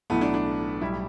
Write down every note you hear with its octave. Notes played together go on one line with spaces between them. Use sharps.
B1 A2 E3 A3 B3
D4
D4
B1 A2 G3 E4